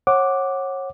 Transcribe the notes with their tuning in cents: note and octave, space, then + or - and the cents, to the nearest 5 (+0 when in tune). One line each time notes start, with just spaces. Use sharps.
C#5 -30 F#5 +0 D6 +0